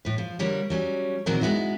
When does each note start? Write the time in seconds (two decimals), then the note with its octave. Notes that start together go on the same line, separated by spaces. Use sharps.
0.05 A2 B4
0.18 F3
0.39 D3 G3 A#3 C#5
0.70 F#3 G3 C#4
1.26 A#2 D#3 E3 F#3 C4 A#4
1.41 G#3 B3 D#4 E4 F#4